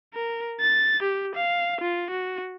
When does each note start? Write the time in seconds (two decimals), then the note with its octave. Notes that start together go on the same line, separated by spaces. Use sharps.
0.14 A#4
0.60 A6
1.03 G4
1.35 F5
1.81 F4
2.11 F#4